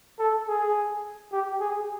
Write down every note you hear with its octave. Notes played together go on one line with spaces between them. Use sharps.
A4
G#4
G4
G#4